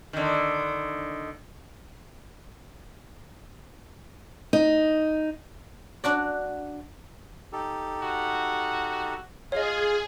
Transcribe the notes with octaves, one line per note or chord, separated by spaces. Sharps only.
D3 D#3
D#4
D4 F#4 D5
D#4 G4 A4
F#4
F4 G#4 C#5 D#5